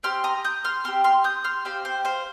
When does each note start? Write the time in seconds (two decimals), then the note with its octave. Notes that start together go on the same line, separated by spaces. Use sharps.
0.03 C4 G4 C6 F6
0.24 A#5 D#6
0.44 D#6 G6
0.64 C6 F6
0.84 C4 G4 C6 F6
1.04 C6 F6
1.24 D#6 G6
1.44 C6 F6
1.65 C4 G4 C5 F5
1.85 C5
2.05 C5 F5